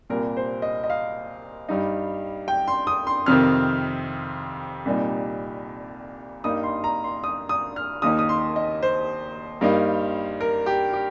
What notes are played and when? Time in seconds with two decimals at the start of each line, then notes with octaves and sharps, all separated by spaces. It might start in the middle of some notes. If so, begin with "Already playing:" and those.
0.10 C2 A#2 G3 A#4
0.37 C5
0.62 D#5
0.84 D#5
0.90 F5
1.69 G2 G3 D#4
2.48 G5
2.68 C6
2.87 D#6
3.07 C6
3.26 F2 C3 D#3 C4 F6
4.85 C2 A#2 G3 D#4
6.44 G2 G3 A#3 D#4 D#6
6.64 C6
6.84 A#5
7.04 C6
7.24 D#6
7.49 D#6
7.76 F6
8.02 D#2 D#3 A#3 D#4 D#6
8.19 D#6
8.29 C6
8.56 D#5
8.83 C5
9.61 G2 G3 A#3 D#4
10.41 A#4
10.66 G4
10.93 G4